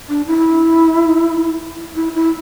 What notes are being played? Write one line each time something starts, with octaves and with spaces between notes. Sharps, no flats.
D4
E4
E4
E4